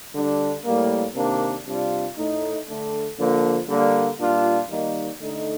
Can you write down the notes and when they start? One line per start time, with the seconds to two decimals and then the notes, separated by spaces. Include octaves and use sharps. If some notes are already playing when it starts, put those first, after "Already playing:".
0.13 D3 G3 D4
0.64 A2 G3 A#3
1.15 C3 D#3 A#3 D4
1.66 C3 G3 D4 F4
2.17 A2 A3 D#4
2.67 D3 A3 D4
3.18 D3 F3 A#3
3.68 D3 G3 A#3
4.19 A#2 G3 D4 F4
4.69 D#3 G3 A#3 D#4
5.20 D3 A3 D#4